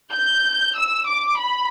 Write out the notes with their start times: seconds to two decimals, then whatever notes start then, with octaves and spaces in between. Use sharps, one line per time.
0.12 G6
0.76 E6
1.07 D6
1.39 B5